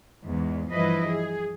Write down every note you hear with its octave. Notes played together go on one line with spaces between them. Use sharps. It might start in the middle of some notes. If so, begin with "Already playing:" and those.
E2 G#2
G2 E3 F3 E4 B4 D#5
G#4